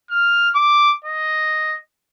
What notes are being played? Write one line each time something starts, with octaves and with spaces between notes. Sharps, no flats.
F6
D6
D#5